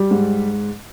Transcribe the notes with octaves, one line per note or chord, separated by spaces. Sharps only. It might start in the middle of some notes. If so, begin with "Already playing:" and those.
Already playing: G3
G#2